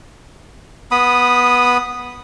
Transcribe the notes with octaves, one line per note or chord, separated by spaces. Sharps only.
B3 B5 D#6